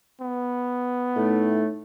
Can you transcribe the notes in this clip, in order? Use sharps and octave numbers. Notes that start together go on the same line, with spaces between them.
B3
A2 A3 D#4